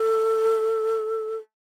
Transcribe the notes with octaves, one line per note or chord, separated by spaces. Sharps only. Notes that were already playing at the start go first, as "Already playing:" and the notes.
Already playing: A4